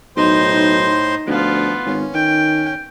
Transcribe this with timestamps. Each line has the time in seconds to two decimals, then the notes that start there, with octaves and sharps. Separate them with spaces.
0.17 B1 A2 D#4 C5 C6
1.27 D2 F3 B3 F4
1.85 G#1 C#4
2.14 D#3 G5